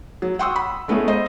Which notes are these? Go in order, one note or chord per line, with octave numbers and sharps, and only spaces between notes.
F#3
F#5 G5 C6 C#6 D#6 E6
B5
G#3 A3 B3 C#4 E4 G#4
C5 D#5